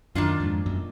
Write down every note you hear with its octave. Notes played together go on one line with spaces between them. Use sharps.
F#2 D#3 A#3 D4 F4
F2 G#2
F#2 A#2